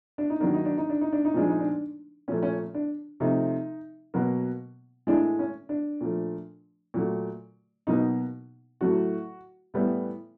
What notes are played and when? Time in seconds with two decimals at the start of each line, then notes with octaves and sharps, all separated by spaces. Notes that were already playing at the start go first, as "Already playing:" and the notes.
0.18 D4
0.30 D#4
0.40 D#3 F#3 A#3 D4
0.54 D#4
0.65 D4
0.78 D#4
0.89 D4
1.01 D#4
1.13 D4
1.25 D#4
1.34 A#2 F3 G#3 D4
1.49 D#4
1.60 D4
2.28 A#2 F3 A3 C#4
2.43 C#4
2.74 D4
3.20 C3 F3 A3 D#4
4.14 B2 F#3 A#3
5.07 A2 E3 G#3 D4
5.39 C#4
5.69 D4
6.01 A#2 F3 A3
6.94 A#2 F#3 A3
7.87 B2 F#3 A#3 D#4
8.81 A2 F#3 A3 F#4
9.74 A2 E3 G3 B3